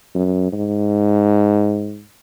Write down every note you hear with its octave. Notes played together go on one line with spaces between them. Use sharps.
F#2
G#2